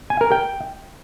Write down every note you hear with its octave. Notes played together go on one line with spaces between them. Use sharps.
G#5
A#4
G5